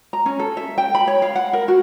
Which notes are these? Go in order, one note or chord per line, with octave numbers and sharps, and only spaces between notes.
A#5
C#4
A4
E5
G5
B5
C#5
F5
F#5
A#4
F#4